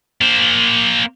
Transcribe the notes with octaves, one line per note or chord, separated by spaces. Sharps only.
A#3 C5